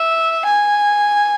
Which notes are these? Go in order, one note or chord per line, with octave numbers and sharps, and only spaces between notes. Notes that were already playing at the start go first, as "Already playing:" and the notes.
Already playing: E5
G#5